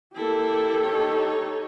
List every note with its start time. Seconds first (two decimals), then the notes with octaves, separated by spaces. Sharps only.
0.16 A#3 E4 G4 A4
0.85 D#4 C#5